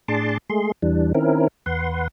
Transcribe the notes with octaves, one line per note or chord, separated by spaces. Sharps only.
A2 D4 G#4 A5 C6 D6
G#3 A3 G#4 C6
E2 E3 G3 D4
D#3 C4 C#4 E4 A#4
E2 B4 F#5 C6